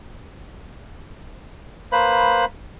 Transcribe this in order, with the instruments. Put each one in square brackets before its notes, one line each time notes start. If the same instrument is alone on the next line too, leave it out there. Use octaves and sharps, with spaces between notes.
[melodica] A#3 B4 C5 B5